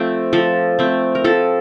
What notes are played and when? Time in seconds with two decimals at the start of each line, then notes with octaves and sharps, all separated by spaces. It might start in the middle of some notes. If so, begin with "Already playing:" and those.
Already playing: F3 A3 C4
0.33 F3 A4
0.79 A3 C4
1.15 A#4
1.24 F3 A4